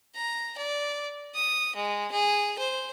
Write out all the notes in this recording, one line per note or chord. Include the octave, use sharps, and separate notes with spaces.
A#5
D5
D#6
G#3
G#4
C5